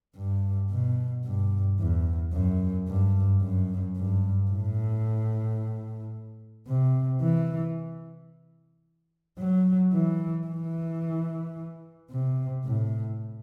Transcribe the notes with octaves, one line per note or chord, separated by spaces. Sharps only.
G2
B2
G2
E2
F#2
G2
F#2
G2
A2
C3
E3
F#3
E3
E3
C3
A2